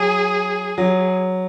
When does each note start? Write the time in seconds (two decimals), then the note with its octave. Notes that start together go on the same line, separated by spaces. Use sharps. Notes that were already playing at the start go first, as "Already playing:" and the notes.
Already playing: F#3 G#4
0.78 F#3